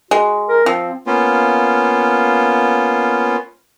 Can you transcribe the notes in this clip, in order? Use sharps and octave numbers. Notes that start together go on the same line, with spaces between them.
G#3 F#4
A#4
F3 C4
A#3 B3 C#4 F4